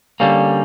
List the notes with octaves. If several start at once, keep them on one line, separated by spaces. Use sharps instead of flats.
D3 G3 A#3 C#4